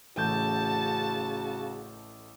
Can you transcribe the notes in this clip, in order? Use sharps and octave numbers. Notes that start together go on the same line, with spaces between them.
A1 C#3 A3 F#4 A5 G6